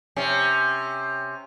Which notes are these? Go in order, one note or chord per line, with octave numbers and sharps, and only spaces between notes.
C3 C#4